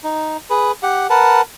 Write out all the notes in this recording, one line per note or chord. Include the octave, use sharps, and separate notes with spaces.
D#4
G#4 B4
G4 F#5
A#4 B4 F#5 A5